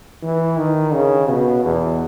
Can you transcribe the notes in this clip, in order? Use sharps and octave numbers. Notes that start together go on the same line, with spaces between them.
E3
D#3
C#3
B2
E2